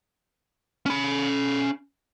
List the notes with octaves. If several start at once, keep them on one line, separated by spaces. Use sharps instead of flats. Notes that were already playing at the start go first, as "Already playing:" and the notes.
C#4 B5